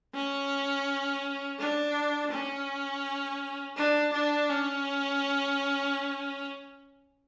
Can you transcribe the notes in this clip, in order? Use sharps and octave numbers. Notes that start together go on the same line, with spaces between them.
C#4
D4
C#4
D4
D4
C#4